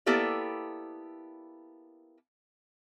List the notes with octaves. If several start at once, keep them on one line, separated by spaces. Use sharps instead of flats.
A#3 B3 E4 G4 A4 D5